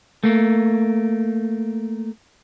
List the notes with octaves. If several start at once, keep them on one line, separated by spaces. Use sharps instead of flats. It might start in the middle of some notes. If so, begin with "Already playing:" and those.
A3 A#3